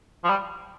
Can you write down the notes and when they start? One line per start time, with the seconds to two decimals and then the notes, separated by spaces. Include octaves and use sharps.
0.24 F3
0.30 G3